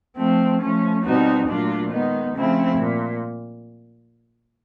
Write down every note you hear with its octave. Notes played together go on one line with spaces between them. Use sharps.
F3 A3 C4
F3 A3 C#4
B2 G3 C4 D#4 F#4
A#2 F#3 A3 D4 F4
D#3 G#3 B3 D#4
C#3 F3 A3 C4 E4
A#2